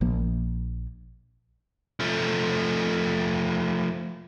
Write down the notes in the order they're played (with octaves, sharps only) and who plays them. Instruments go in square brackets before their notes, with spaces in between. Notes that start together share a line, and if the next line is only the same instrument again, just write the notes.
[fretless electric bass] A#1 F3 A#3
[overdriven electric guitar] F3 A3